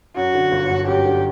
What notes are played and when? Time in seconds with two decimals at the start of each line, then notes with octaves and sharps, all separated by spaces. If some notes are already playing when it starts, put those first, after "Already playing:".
0.17 F#2 F#4
0.34 D3
0.52 G1
0.70 G1
0.87 F#2 G4
1.05 D3